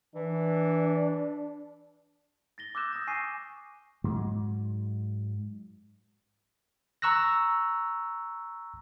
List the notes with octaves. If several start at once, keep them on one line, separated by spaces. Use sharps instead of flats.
E3 D4
A6 A#6 G7
D6 E6 F#6 G6 E7
D#6 A#6
G#5 C#6 C7 D#7
G#2 F#3
A#5 C#6 E6 F#6 A#6